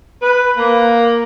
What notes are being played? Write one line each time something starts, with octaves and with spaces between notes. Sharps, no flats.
B4
A#3